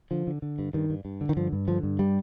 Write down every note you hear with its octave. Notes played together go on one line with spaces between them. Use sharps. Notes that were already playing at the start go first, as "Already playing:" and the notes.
D3 F3
D3
D3
G2
G2 D#3
G2
G2
D3
D#3
G2 F3
G2
D3 F3
G2
G3